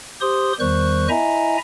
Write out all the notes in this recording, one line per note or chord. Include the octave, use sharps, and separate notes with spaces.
G4 C5 C6 D#6
E2 D#3 G3 C5 C#6 F#6
E4 D#5 E5 G#5 A#5